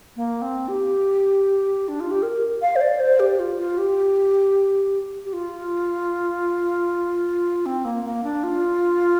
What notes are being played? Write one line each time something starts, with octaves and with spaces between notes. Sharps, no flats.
A#3
C4
G4
D4
F4
G4
A#4
F5
C5
D5
C5
G4
F4
F4
G4
G4
F4
C4
A#3
A#3
D4
F4